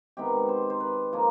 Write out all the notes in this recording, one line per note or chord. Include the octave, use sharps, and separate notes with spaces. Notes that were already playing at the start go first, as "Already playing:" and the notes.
C3 D#3 G#3 B3 G4
C5
C5
B4
F3 A#3